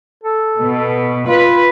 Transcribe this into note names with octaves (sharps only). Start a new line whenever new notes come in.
A4
B2
F4 B4